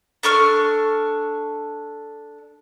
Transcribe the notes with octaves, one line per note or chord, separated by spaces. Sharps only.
D4 A4 C#6 F6